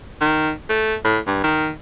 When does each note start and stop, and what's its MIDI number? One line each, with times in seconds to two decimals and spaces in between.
0.21 0.51 51
0.69 0.95 57
1.04 1.19 45
1.27 1.44 43
1.44 1.71 51